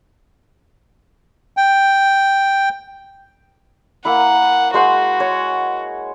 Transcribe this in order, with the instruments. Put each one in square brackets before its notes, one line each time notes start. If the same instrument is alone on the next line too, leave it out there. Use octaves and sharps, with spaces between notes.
[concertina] G5
[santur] A#3 E4 [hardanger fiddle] F#5
[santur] G#3 C5 F#5 [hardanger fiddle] F#4
[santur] C#5